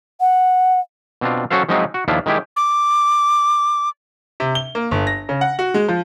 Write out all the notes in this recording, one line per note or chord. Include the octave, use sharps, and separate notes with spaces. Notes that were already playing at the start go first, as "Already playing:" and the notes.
F#5
B2 C4 D4 F4
F#3 C#4 F#4 A4 C5 F5
F3 F#3 G#3 C4 D#4 E4
F#4
D#2 F3 D4 E4 F4
D#3 G#3 E4 G4 G#5
D6
C3
G7
A#3
G1
A#6
C#3
F#5
F#4
G#3
F3